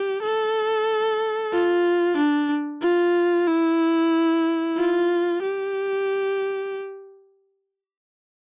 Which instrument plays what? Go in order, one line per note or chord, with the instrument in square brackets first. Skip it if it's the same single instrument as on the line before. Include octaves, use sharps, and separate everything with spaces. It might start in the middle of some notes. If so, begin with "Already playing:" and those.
Already playing: [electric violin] G4
A4
F4
D4
F4
E4
F4
G4